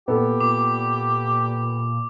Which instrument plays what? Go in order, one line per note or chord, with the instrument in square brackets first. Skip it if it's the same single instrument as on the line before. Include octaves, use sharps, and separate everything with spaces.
[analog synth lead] A#2 [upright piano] B3 A4 [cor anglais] G4
[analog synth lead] A#2 [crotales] D6